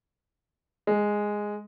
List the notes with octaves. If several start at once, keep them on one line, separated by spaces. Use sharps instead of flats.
G#3